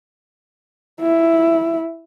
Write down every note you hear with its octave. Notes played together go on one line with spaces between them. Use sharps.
E4